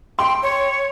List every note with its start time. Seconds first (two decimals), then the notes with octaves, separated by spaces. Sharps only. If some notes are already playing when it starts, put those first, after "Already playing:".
0.19 G5 C6
0.43 C#5